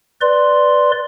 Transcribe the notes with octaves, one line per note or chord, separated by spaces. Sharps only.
B4 D5 C6